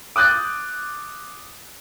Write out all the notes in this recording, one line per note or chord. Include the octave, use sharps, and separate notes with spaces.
D6 D#6 F#6 G6 A6